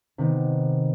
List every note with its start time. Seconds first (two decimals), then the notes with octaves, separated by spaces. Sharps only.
0.18 C3 D#3 B3